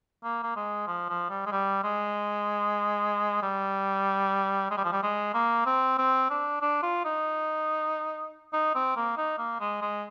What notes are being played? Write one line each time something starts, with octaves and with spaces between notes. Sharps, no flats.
A#3
A#3
G#3
F3
F3
G3
G#3
G3
G#3
G3
G#3
G3
F3
G3
G#3
A#3
C4
C4
D4
D4
F4
D#4
D#4
C4
A#3
D#4
A#3
G#3
G#3